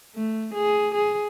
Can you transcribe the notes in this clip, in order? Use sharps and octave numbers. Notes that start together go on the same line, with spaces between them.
A3
G#4
G#4